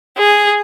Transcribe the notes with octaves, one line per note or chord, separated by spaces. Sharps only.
G#4